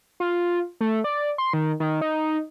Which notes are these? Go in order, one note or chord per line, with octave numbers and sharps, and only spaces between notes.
F4
A3
D5
C6
D#3
D#3
D#4